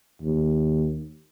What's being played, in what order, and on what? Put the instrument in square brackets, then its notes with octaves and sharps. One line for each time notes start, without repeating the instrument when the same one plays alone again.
[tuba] D#2